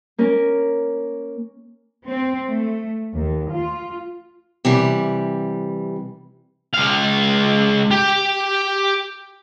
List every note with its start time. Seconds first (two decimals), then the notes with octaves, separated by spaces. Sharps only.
0.18 A#3 C#4 A#4
2.06 C4
2.49 A3
3.15 D#2
3.53 F4
4.65 C3 E3 G3
6.74 C#2 F5
7.91 G4